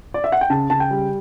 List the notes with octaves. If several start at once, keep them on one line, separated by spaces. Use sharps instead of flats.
D5
E5
F#5
G5
C#3 A5
C#3 A5
G5
G3